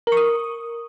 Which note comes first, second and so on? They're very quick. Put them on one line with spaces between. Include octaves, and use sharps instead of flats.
A#4 C#6 D#6